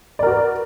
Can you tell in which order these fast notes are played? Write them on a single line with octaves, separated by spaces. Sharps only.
D5 A#4 F#4 B4